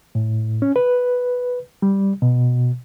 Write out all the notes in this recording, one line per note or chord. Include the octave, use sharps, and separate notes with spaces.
A2
C#4
B4
G3
B2